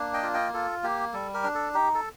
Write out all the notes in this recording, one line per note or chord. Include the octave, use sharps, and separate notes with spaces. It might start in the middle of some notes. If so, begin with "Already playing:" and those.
Already playing: A#3 D4
D#5 G5
F4
D#5 G5
F4 A4
A#3 G4
G3 A4
G4 A#4
D4
A4
D#4 G4
A4